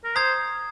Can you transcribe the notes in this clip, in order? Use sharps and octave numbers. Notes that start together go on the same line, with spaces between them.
A#4
C5 A#5 D#6 G#6